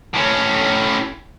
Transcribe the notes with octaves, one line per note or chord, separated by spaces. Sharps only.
A2 C#4